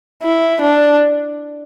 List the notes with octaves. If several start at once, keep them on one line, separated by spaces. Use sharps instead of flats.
E4
D4